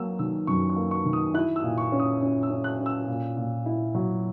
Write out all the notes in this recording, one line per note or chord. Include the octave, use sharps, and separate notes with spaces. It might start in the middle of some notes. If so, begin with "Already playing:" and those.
Already playing: F#3 A#3 E6
D#3 E6
F#2 C#6
C#6
A#3
C#6
D#3
D#6
E4 F#6
E6
A#2
C#6
C#4
D#6
C#4
E6
C#4
F#6
C#4
E6
A#2
A#2
E4
F#3